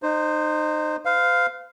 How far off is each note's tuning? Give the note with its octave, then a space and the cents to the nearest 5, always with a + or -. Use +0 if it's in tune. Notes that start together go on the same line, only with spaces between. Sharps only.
D#4 -25 C5 +0
C5 -45 F5 +0